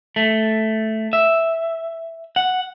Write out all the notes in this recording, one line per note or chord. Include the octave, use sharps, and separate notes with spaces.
A3
E5
F#5